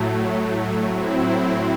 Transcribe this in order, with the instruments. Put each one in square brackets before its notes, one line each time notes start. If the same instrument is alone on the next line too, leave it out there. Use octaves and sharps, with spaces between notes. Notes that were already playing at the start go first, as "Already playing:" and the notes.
Already playing: [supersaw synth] A2 F#3 A3
A2 F#3 C4 E4